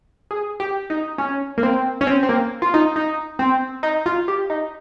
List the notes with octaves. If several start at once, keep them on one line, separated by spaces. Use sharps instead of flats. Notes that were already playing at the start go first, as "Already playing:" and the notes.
G#4
G4
D#4
C#4
A#3
C4
C#4
C4
C4
A#3
F4
D#4
D#4
C4
D#4
F4
G4
D#4